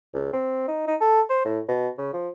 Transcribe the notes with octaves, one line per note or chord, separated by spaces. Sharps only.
C#2
C4
D#4
D#4
A4
C5
A2
B2
C#3
F3